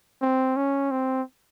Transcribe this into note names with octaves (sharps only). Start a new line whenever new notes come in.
C4
C#4
C4